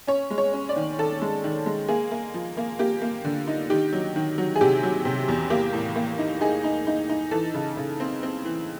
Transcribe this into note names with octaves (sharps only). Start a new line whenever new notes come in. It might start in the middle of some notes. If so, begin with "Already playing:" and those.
C#4 C#5
G#3
C#5
C#4
D5
D#3
D#3 A4
G#3
D#3
G#3
A#3 G#4
A#3
F3
A#3
A#3 G4
A#3
D3
D#4
D#3 G4
F#3
D#3
F#3
G#4
C3 G4
F#3
C3
E2
A#3 G4
A2
A#3
D#4
D#4 G#4
D#4
D#4
D#4
E3 A4
C#3
C#3
C4
C4
E3